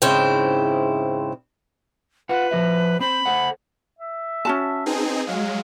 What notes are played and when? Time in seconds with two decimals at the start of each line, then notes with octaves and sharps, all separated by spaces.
0.02 E2 G#2 C#3 C4 E4 G5
2.29 F4 B4 F#5
2.51 F3 F#4 E5
3.00 C4 C5 B5
3.26 A4 C5 F#5
3.99 E5
4.45 C#4 F#4 A5
4.86 C4 D#4 G#4 B4
5.27 F#3 G#3 F5